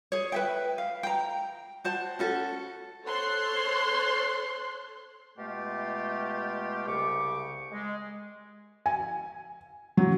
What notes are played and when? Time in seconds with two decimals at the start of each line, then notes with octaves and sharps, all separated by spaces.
0.12 G#4 C#5
0.32 B4 E5 G5
0.78 F5
1.03 G5 A#5
1.84 F#4 C5 A5
2.19 C#4 F#4 A4
3.04 A4 C5 C#5 C6 F#6
5.37 B2 G#3 A3 F4 G4
6.87 C2 C#3 G4 C#6 D6
7.72 G#3
8.86 G#5
9.97 F#3